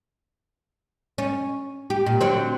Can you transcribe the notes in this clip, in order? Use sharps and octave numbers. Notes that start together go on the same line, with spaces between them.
C#4
G4
A#2
D2 F#3 C4